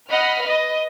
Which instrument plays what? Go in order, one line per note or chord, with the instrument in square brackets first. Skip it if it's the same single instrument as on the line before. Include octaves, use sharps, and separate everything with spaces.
[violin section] D#5 F#5 B5 F6
B4 D#5